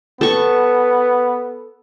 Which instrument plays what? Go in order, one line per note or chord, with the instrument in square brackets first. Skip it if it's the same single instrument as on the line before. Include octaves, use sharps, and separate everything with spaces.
[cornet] B3 [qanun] A4 C#6